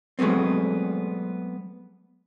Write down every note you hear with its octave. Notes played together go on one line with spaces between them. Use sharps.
F#3 G#3 A3 B3 C4